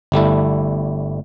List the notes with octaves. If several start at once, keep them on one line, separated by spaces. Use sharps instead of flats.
G1 G3 A3 E4